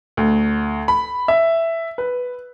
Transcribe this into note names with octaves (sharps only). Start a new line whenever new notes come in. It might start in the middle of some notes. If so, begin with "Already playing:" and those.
D2
B5
E5
B4